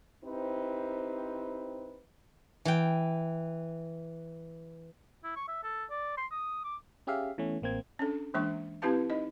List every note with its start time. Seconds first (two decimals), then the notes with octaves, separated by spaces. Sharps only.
0.24 C4 D#4 E4 G4 B4 C5
2.65 E3 G5
5.24 E4
5.36 C#6
5.48 E5
5.64 A4
5.90 D5
6.17 C6
6.31 D#6
6.64 D6
7.07 C#4 G4 G#4 E5 F5
7.38 E3 A3 B3 C#4
7.62 A1 A#3 C4 G#6
7.99 C#4 D4 A4
8.34 E3 G#3 A#3 D4 E5 C#6
8.82 C4 E4 G4 B4 F5 A5
9.10 D#4 D#5